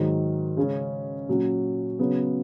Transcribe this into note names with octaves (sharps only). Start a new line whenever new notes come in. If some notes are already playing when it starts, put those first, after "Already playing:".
Already playing: G#2 D#3 F#3
C#3 G#3 C#4
A#2 F#3 C#4 F#4
C#3 F#3 B3